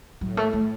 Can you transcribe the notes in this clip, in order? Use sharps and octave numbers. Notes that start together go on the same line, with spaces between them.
A2 F#3
A3
A3